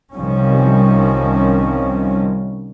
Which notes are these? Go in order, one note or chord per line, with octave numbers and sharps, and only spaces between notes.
C2 C3 D#3 F3 G3 C#4